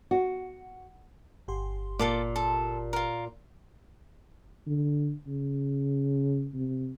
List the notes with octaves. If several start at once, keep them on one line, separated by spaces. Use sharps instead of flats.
F#4
G1 G4 C6
A#2 F4 A4 D6
A4
F4 A#4
D3
C#3
C3